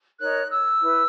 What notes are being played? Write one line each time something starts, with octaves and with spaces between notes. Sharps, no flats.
D#4 A#4 C#5 F#6
E6
E4 B4